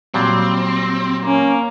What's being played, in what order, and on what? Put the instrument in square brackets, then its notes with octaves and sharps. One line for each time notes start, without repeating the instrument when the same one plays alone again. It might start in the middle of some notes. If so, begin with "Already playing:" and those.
[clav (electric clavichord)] A#2 F#3 G3 [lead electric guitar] C4
[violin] A#3 [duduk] C#4